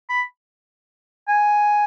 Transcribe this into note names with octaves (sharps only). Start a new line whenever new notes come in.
B5
G#5